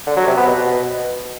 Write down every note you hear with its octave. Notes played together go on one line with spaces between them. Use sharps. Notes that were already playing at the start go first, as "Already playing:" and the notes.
D3
F#3
C3
B3
B2